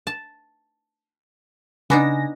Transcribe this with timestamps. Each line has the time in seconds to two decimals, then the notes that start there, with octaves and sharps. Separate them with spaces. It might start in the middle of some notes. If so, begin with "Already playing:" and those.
0.07 A5
1.90 C#3 B3 D4 D#4 G#5 A#6